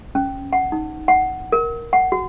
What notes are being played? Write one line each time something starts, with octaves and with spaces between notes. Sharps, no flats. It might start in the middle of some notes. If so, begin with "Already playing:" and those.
C#4
F#5
D#4
F#5
A#4
F#5
F#4